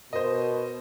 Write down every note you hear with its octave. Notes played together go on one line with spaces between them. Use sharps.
B2 A#4 C5 D#5